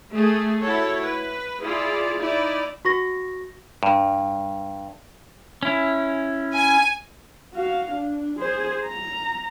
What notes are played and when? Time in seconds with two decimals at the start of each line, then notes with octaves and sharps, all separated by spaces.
0.11 A3 G#4 A4
0.61 E4 F#4 A4 C#5
1.05 B4
1.61 E4 F4 G#4 D5
2.20 D#4 E4 D5
2.85 F#4 C#6 A#6
3.83 G2
5.63 C#4 E4
6.55 G#5
7.54 F#4 F5
7.91 D4
8.39 G#4 C5
8.85 A#5